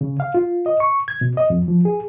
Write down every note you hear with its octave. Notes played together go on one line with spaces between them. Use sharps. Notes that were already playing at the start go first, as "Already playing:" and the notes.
C#3
F5
F4
D#5
C#6
G#6
B2
D#5
F2
F3
G#4